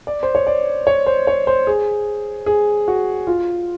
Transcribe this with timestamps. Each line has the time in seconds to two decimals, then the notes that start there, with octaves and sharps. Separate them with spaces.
0.07 D5
0.23 C5
0.35 C#5
0.47 D5
0.87 C#5
1.06 C5
1.27 C#5
1.47 C5
1.67 G#4
2.46 G#4
2.88 F#4
3.27 F4